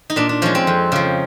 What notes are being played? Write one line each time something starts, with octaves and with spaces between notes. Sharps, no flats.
D#4
A#2 D4
D4
F3 G#3 C#4
C4
F2
C#3 F3